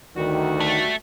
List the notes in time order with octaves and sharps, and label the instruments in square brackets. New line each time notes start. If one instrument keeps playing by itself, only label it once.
[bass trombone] D2 [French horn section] D#3 [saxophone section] G3 F#4
[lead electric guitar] A3